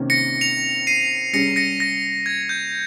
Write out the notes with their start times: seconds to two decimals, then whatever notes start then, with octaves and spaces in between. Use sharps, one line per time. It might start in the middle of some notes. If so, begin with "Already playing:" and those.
Already playing: C3 D#3 A#3 C#4
0.10 A#6 C#7
0.41 C#7 F7
0.87 C7 D#7
1.33 G3 C#4 G#4 A#6 C#7
1.56 A#6 C#7
1.80 A#6
2.26 G#6
2.49 G6